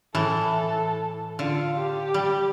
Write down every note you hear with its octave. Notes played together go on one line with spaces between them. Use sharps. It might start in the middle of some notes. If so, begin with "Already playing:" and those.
A2 E3 A4
D3 F4 F5
G4
G3